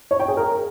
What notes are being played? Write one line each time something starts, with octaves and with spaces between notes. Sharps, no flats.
C#5
G5
G#4
A#4